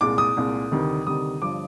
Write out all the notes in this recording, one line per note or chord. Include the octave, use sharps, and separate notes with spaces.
C2 A#2 G#3 D6
D#6
C2 A#2 G#3
D2 C3 D#3 G3
D2 C3 D#3 G3 D#6
G1 G2 F3 D6